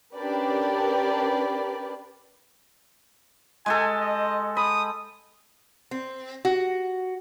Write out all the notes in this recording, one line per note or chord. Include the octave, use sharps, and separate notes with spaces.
C#4 D4 G4 A#4 B4 D5
G#3 G4 A4 G#5
D#5
B5 D#6
C4
F#4